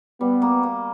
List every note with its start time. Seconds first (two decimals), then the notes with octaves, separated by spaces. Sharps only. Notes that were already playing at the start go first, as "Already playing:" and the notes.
0.21 G3 B3
0.42 A#3
0.63 A#3